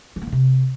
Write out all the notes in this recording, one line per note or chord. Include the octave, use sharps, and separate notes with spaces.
E3
A#3
D#3
C3